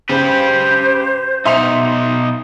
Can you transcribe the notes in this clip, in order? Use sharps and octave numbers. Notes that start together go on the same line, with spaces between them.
C#3 G4 B4 C5
B2 D#4 E5 C6 F7